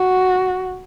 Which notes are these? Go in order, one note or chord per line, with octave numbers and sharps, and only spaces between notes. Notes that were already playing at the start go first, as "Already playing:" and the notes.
Already playing: F#4